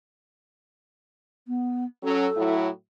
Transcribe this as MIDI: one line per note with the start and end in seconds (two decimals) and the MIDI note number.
1.47 1.84 59
2.03 2.27 54
2.03 2.27 61
2.03 2.54 69
2.36 2.70 45
2.36 2.70 54
2.36 2.70 64